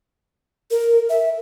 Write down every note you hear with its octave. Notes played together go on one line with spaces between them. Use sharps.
A#4
E5